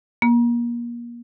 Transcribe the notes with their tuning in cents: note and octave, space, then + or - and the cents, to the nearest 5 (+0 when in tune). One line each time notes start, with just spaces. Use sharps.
A#3 +30